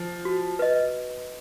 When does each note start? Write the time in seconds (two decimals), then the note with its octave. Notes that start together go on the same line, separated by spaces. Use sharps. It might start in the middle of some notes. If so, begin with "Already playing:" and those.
Already playing: F3
0.25 F#4
0.59 B4 D#5